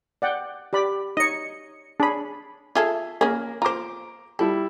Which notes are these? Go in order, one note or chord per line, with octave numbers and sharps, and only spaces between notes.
D5 F#5 G5
G4 D5 B5
D#4 C#5 D#5 C#7
D4 G#4 C#5 B5
F4 G#4 A4 E5
A#3 C#4 G#4
F4 C5 A#5 D6
G3 E4 A4